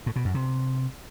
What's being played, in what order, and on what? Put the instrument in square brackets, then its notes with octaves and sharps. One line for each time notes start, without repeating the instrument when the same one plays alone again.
[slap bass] A2
B2
F#2
C3